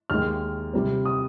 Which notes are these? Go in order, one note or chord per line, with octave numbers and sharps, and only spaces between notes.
D#2 D#3 G#3 F6
C3 G3 C4
D#6